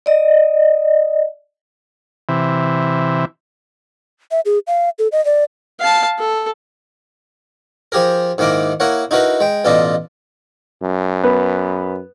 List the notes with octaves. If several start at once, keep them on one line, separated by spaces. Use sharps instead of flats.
D5 D#5
C3 E3
E5
G#4
F5
A4
D#5
D5
F5 A5
A4
F3 G4 G#4 A#4
G#2 D#3 A#3 E4 A#4 D6
A#3 E4 A#4 C#5 F#5
D#4 E4 F#4 A#4 B4
G#3 G5
A1 B2 F4 A4 D5 D#5
F#2
B3